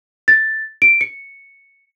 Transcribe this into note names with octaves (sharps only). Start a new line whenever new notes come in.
A6
D7
C#7